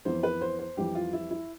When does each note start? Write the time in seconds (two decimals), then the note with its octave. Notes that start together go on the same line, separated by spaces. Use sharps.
0.05 F2 E3 B3 C5
0.23 B4
0.41 C5
0.59 C5
0.77 F2 E3 G3 G4
0.95 F4
1.13 E4
1.31 E4